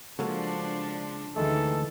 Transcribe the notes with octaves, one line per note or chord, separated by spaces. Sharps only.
C#3 F3 G#3 A#3 D4 F#4 A4
D2 D#3 E3 G#3 A3 A4